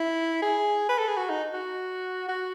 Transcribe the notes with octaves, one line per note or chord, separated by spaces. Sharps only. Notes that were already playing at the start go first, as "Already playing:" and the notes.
Already playing: E4
G#4
B4
A4
G#4
F#4
D#4
F#4
F#4